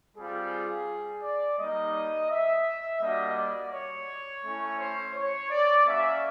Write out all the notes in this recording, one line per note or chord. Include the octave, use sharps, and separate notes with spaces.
G3 C4 F4 G#4
D5
G3 A#3 D#4 D#5
E5
G3 A#3 D4 F#4 D#5
D5
C#5
A3 C#4 E4
C5
C#5
D5
A#3 C#4 F#4 E5